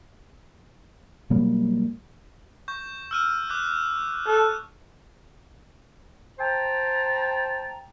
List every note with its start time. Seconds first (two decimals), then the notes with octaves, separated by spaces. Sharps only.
1.30 B2 F#3 G3 A#3
2.68 C#6 G6
3.11 E6 F6 D#7
3.50 D6 F#6 G6
4.26 A4 F6 F#6
6.39 C5 G5 A5 A#5